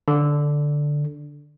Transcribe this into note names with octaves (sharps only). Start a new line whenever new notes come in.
D3